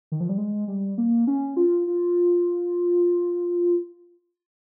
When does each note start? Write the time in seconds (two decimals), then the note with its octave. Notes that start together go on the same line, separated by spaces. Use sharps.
0.12 D#3
0.20 F3
0.29 G3
0.38 G#3
0.68 G3
0.98 A#3
1.27 C#4
1.57 F4
1.87 F4